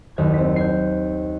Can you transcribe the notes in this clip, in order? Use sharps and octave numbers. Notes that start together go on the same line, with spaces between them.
F#1 D#2 G#6
C4 B6
G6 G#6 C7